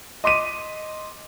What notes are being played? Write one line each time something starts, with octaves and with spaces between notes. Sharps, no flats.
D#5 C6 D6 B6 D#7